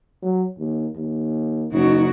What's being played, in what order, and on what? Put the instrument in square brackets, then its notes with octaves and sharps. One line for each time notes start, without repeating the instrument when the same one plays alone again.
[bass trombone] F#3
D#2
D#2
[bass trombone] F#1 [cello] C#3 F#4 [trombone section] D#4